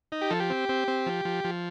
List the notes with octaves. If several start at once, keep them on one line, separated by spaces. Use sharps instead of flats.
D#4
G4
F3 A4
G4
C4
C4
C4
F3
F3
F3